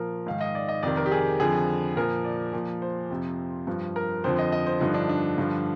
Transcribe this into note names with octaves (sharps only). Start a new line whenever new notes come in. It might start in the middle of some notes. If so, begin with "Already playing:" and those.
Already playing: A#2 F3 A#4
G#2 D#3 F5
D#5
D5
D#5
F2 C3 D#3 D5
A#4
G4
G#4
F2 D3 F3 G#4
A#2 F3 A#4
D5
A#2 F3
C5
F2 C3 F3
G2 F3
A#4
F2 D3 F3 C5
D#5
D#5
C5
G2 D3 F3 D#4
D4
D4
G2 D3 F3